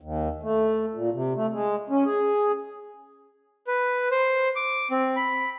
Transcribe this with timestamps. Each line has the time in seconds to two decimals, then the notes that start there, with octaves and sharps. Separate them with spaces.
0.01 D#2
0.43 A3
0.95 A#2
1.14 C3
1.36 A3
1.52 G#3
1.90 C#4
2.06 G#4
3.67 B4
4.11 C5
4.56 D6
4.91 C4
5.16 B5